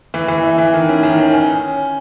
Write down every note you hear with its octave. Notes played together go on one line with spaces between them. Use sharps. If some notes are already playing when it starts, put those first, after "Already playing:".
E3
E3
E4
E3
D#3
C#4
D#3
C#4
C#4